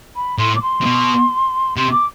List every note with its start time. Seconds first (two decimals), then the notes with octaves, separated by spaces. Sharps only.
0.16 B5
0.39 A2 C6
0.55 D6
0.62 C6
0.81 C3
0.85 B2
1.77 C3 C6
1.92 D6